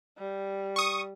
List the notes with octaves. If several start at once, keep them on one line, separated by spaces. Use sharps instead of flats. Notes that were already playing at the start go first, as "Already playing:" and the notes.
G3
C#6 D#6